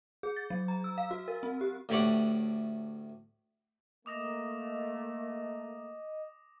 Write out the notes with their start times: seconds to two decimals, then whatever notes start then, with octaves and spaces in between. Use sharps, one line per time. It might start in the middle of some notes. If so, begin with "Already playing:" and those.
0.23 G#4
0.36 A6
0.50 F#3
0.68 A#5
0.84 E6
0.98 F5
1.11 F#4
1.28 A#4
1.43 C4
1.61 G4
1.89 D2 A2 G4 C#5 D5 F#5
4.06 A3 A#3 D#5 D6 D#6 A#6